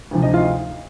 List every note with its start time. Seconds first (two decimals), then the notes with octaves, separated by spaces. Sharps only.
0.11 D2 C3 F3
0.22 D#4 D#5
0.34 F4 F5